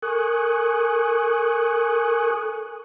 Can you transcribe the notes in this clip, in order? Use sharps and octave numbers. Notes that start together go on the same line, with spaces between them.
A4 A#4 G#5 C#6 D#6 F#6